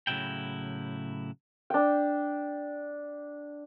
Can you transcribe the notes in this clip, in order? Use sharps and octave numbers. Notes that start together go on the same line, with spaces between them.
A2 C#3 E3 F#3 E4 G5
D4 G5